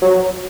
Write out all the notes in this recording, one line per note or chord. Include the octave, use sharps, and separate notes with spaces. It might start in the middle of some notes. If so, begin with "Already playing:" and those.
F#3